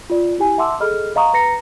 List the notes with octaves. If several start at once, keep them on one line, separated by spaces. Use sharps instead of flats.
F4 D5
E4 G4 G#5
E5 F#5 A5 C6 D6 E6
G#4 A4 D#5 B5 F6
D#5 F5 F#5 A#5 C#6 D#6
B4 A#5 A#6 C#7